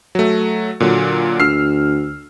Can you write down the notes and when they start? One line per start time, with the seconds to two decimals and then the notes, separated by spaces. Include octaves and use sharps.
0.15 F#3 A3
0.80 A#2 D3 F#3
1.40 D2 E6 F6 C7